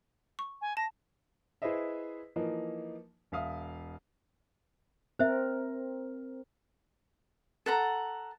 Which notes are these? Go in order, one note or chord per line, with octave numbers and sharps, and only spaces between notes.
C#6
G#5
A5 A#6
E4 G#4 B4 C5 D#5 E5
E3 F3 A#3 D#4
E1 E5 F5 D#6
C4 A#4 C5 E5
A4 F#5 A#5